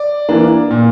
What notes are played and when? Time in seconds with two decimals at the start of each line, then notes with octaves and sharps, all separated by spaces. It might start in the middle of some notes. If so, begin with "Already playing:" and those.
Already playing: D5
0.29 E3 A#3 D4
0.71 A#2